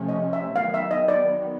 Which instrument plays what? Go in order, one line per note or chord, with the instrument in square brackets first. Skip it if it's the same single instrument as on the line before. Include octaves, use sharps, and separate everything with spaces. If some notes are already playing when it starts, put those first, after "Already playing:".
Already playing: [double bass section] C3 F3 A3 C#4
[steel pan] D#5
E5
[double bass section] D#3 F#3 B3 [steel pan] F5
[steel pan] E5
D#5
D5